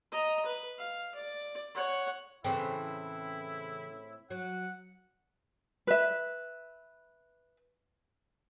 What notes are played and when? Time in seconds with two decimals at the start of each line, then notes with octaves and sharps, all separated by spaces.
0.12 D#5 A#5
0.46 B4
0.78 F5
1.15 D5
1.75 C#5 F#5
2.44 A2 C#3 E3 C4 E4
4.30 F#3 F#5
5.87 B4 E5